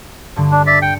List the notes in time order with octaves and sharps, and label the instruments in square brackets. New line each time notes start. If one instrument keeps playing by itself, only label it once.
[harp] G2 D3
[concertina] D4
D5 E5
[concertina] G5 [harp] C#7